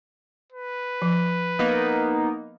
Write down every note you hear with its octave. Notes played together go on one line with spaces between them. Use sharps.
B4
F3
A#3 B3 D#4